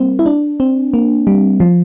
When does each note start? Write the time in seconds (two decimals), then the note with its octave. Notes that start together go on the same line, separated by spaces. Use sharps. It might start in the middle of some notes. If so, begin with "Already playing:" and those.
Already playing: G3 A#3 C4
0.19 E4
0.26 D4
0.60 C4
0.94 A#3
1.27 G3
1.60 F3